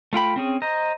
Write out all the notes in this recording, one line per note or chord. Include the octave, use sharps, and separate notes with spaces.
A3 F4 G5 B5
C4 C#4 G#4
C5 D#5 A#5